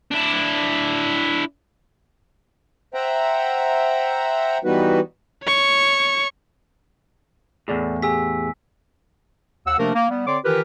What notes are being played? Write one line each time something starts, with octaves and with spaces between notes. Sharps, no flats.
D4 E4
C5 E5 F#5 G5 A#5
E3 G3 B3 D#4 F#4 B4
C#5 C#6
E2 A2 G#4 D5
G4 G#4 G#5 E6 B6
D#2 F#5 E6
C3 F3 A3 A#3 D4 A#4
A#3
G3 B3
D3 C4 C#5 D5 C6 D6
D#3 E3 F4 G4 A#4 B4